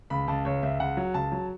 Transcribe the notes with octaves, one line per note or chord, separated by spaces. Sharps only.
C#2 B5
C#2 A5
C#2 C#5
C#2 E5
C#2 F#5
F#3
C#2 A5
F#3